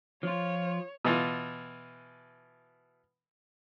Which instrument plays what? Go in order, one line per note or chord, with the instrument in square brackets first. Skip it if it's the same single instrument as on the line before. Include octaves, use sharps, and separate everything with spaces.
[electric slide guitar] F3 F4 [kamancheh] C#5
[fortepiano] B2 E3 F4